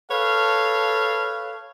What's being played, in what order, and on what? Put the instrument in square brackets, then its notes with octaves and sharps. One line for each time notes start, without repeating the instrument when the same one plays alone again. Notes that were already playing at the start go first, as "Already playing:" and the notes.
[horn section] A4 B4 C#5 F5